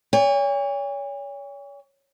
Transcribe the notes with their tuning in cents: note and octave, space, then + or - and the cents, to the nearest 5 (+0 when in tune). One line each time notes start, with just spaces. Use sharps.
C#5 +35 G#5 -45